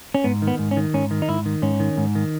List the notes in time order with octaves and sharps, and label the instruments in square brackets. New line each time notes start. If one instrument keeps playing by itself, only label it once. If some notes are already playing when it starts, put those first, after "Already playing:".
[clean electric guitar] C#4
G#2 B3
D#3
B3
G#2
C#4
D#3
G#2 C#4
D#3
D#4
G#2 E4
D#3
G#2 C#4
D#3
G#2
D#3